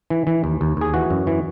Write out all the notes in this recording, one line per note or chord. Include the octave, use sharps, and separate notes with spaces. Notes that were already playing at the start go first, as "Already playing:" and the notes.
E3
E3
D#2
D#2
D#2 G#4
E3 F#4
F#2
E3